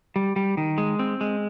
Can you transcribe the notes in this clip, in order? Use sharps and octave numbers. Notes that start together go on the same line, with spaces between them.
G3
G3
D#3
G#3
C4
G#3